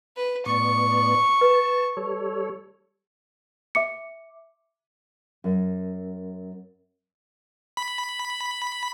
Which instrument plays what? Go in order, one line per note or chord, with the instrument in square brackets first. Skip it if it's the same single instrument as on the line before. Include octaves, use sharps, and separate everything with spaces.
[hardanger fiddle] B4
[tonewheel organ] A2 B3 D5 [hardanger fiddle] C#6
[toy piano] B4 [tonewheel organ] A5
[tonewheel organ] G3 A4 C#5
[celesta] E5 D6 C#7
[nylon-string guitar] F#2
[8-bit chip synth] B5